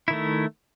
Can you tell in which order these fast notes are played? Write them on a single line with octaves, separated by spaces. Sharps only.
E4 D#3 A3